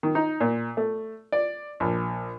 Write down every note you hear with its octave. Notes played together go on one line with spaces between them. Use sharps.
D#3
D#4
A#2
A3
D5
A#1